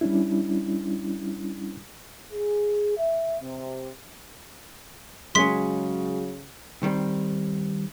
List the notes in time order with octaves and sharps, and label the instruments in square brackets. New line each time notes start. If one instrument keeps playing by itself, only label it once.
[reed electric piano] G3 C#4 D4 E4
[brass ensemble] G#4
E5
C3
[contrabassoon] C#3 [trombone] F#3 [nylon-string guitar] G#3 C#4 [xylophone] C6 B6
[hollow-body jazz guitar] D#3 G3 C4